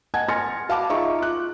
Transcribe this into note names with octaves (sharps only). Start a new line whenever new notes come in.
D#5 F#5 G#5 A5 G#6
G#5 C6 F6 A6 A#6 C#7
F#4 F5 F#5 A5 B5 D6
D#4 F4 G#4 E5 A#5 C#6
F4 F#6